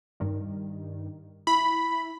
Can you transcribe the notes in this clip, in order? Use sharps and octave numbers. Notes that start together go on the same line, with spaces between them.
G2 D#3 G3
E4 B5